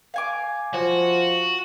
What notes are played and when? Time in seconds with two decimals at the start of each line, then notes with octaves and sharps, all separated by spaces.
0.14 F5 G#5 D6
0.74 F3 F#4